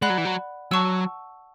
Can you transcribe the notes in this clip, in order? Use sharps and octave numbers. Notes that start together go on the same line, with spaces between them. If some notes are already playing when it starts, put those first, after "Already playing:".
G#3 D5 F#5 B5 F#6
F#3
E3
F#3
F#3 F#5 A5 C#6 E6